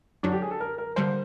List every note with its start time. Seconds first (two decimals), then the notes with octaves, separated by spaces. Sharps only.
0.23 F#2 D3 F#3 D4
0.32 G4
0.42 G#4
0.51 A4
0.60 A#4
0.78 A#4
0.96 D3 G3 A#3 C5